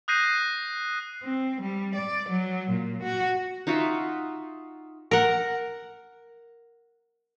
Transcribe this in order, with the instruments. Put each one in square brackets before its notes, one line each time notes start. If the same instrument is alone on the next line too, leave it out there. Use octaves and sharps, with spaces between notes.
[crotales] D#6 F#6 G6 A#6 C7 D#7
[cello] C4
G3
D5
F#3
A#2
F#4
[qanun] D#4 F4 F#4 E5
[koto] A#4 F#5